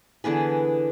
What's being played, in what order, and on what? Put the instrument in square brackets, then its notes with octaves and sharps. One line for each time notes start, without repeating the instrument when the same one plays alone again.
[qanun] D3 E3 B3 G#4